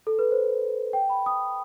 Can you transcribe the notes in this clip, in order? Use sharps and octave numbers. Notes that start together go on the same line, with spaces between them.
A4
B4
C5
G5
B5
D#6